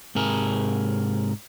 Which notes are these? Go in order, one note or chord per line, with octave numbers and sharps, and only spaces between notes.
G#2 C3 G#4 A#4